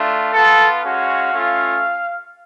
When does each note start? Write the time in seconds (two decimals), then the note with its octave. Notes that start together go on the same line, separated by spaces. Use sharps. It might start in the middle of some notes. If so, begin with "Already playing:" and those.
Already playing: A3 D4 F4
0.33 B3 F4 A4
0.83 G#3 C#4 F#4 F5
1.33 A3 C#4 F4